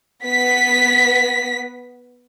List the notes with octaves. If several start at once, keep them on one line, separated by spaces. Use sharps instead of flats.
B3 B6